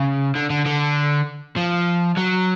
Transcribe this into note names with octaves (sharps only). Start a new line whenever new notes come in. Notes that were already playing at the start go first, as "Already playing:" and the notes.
Already playing: C#3
D3
D3
D3
F3
F#3